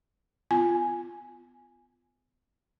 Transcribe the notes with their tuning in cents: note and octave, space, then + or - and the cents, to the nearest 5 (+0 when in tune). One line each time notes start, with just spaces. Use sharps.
B3 +30 F4 -15 G#5 +0